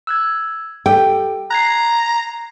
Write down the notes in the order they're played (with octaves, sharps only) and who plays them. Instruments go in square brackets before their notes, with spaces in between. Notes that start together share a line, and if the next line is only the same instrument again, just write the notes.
[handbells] E6 F#6 G#6
[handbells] G4 A4 [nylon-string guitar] G5
[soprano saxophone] A#5 [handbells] F#6 G#6 C7